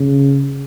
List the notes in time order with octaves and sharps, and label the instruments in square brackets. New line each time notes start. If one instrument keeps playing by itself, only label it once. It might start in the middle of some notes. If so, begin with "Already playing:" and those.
Already playing: [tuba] C#3